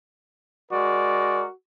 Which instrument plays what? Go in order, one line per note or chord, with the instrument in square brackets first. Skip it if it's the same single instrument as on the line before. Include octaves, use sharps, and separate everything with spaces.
[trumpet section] G#3 A#4 D5 [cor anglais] F#4